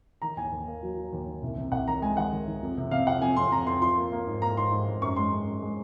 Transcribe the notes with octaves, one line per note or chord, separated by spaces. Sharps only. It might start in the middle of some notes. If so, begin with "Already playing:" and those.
D#3 A#5
D#2 G#5
D#2
A#3
F#3
F#3
D#2
D#3
C2
C3
C2 F#5
D#3 A#5
G#3 G#5
D#3 F#5
D#3
D#3
F2
C3
C3 F5
F2 F#5
F2 G#5
F2 C6
C3 A#5
F2 C6
F3 C6
A#3
A#3
G#2
A#3 A#5
G#2 C6
G#2
G#2
F#2 C#6
G#3 C6
F#2
F#2
G#3